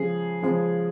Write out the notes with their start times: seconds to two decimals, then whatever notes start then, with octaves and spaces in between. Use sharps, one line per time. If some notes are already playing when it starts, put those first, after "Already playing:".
Already playing: C#3 F3 G#3 G#4
0.42 C#3 F3 G#3